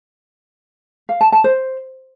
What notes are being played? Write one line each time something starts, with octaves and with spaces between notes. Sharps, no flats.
F5
A5
A5
C5